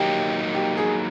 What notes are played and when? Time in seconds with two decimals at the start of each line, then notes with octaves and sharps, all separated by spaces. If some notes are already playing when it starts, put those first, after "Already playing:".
Already playing: F#3 A#3 D#4 G4
0.54 G4
0.77 G#4